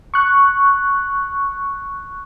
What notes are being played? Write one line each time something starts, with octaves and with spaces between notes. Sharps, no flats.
C#6 F#6